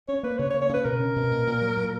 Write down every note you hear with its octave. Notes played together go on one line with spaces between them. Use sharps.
C#4 C#5
A#3 B4
C#3 C#5
C#5
A#3
C#5
C#3 B4
B2 A#4
C#4
B2
A#2
A#2
F#3
A#2